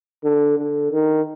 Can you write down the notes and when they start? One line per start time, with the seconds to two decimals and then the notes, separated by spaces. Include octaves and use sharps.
0.24 D3
0.57 D3
0.92 D#3